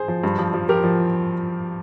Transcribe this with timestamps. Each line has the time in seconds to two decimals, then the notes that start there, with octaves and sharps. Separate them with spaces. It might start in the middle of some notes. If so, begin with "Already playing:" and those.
Already playing: G#4 C5
0.08 F3
0.24 G2
0.38 F3
0.54 F3
0.69 F3 G4 A#4
0.84 F3